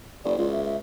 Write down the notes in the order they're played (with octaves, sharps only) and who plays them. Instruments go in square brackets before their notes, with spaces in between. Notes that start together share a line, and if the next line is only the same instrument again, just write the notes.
[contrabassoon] F#1 [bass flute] D5
[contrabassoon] C#2 [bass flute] F4
[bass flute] E5
E5